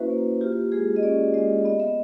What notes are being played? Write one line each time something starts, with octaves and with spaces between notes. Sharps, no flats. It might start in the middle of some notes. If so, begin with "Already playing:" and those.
Already playing: A#3 C#4 E4 F#4 B4 C5 E5
A#3
F4 G4
G#3 G#4
D#5
C#4 D5
G#3 D#5
B3 D#5
E5